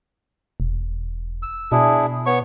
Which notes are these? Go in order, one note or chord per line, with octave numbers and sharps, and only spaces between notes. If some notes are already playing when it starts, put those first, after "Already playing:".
E1
E6
B2 D4 E4 G#4
B3 C#5 C#6